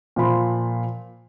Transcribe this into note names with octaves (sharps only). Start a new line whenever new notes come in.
A#2 F3 B5 C6